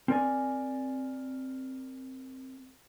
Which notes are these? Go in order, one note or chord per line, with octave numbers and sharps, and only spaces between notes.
C4 A#4 D5 G#5